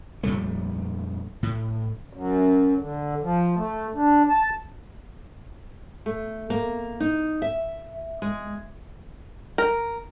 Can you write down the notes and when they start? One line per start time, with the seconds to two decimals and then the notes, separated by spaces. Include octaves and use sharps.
0.23 F2 A#2 G3 A3
1.43 A2
2.13 F#2
2.79 D3
3.23 F3
3.57 A3
3.95 D4
4.30 A5
6.06 A3
6.50 A#3
7.00 D#4
7.42 E5
8.22 G#3
9.58 A#4